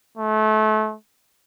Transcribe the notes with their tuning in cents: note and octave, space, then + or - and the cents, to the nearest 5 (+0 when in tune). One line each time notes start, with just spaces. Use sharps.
A3 -30